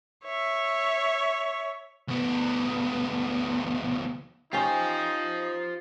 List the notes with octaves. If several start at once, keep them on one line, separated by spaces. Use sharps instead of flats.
C#5 E5
D2 B3
C#4 D#4 F4 G4 C5